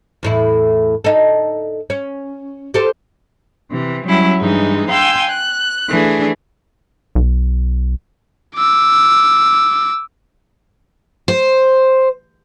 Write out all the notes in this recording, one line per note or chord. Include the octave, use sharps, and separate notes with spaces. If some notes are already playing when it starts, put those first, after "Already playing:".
E2 A2 E4
D#4 A4
C#4
G4 A4 C5
C3 E3
F#3 G3 C#4 E4
G2 E3 G#3 D#4
F5 G5 G#5 C6 E6
F#6
E3 A3 D4 G#4
B1
D6 E6
C5